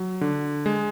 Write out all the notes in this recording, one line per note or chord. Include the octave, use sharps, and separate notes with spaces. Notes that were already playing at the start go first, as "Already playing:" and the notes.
Already playing: F#3
D3
G#3